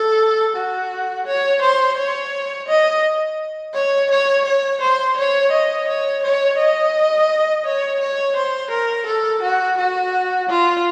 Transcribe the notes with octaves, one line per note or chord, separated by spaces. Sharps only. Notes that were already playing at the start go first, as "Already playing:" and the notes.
Already playing: A4
F#4
C#5
C5
C#5
D#5
C#5
C#5
C#5
C5
C#5
D#5
C#5
C#5
D#5
C#5
C#5
C5
A#4
A4
F#4
F#4
F4